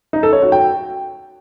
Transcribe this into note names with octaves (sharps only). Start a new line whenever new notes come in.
D#4
A4
C#5
F#4
G5